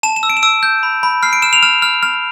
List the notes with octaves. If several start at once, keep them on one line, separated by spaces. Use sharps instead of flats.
A5 E7
E7
E6
D7
E7
E6 D7
G6
B5
B5
F6 C7
D7
F6 E7
F7
F6 E7
F6
F6